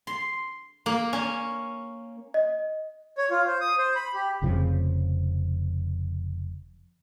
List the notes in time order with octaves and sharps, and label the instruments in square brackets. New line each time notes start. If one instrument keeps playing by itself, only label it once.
[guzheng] C6
A#3
C#4
[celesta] D#5
[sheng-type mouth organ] C#5
F4
C5
D#6
C5
B5
G4
[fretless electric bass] F1 F2 C#3 F3